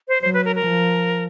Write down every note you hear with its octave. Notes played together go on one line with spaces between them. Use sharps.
C5
F#3 C5
B4
A#4
A#4
F3